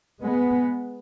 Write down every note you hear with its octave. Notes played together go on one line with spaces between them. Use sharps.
G#3 B3